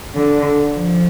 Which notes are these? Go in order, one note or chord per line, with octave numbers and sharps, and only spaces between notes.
D3
F3